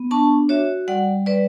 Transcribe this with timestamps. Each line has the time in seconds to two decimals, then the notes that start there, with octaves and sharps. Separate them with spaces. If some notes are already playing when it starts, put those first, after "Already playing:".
Already playing: B3
0.11 D4 A5 C#6
0.49 F#4 C#5 E5
0.88 G3 D5 F#5
1.26 G3 B4 D5